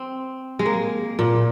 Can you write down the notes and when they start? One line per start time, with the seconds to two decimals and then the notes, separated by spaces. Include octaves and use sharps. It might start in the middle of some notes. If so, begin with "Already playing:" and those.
Already playing: C4
0.59 G#3
0.66 A#3
1.19 A#2